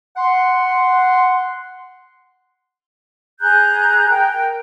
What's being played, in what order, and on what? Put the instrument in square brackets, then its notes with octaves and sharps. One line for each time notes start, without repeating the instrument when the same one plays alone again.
[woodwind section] F#5 C6
[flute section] G#4 A#5 F#6 G6
A#4 G5